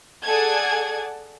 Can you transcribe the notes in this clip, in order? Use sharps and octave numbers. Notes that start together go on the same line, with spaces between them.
G#4 A4 D5 F#5 A5 G#6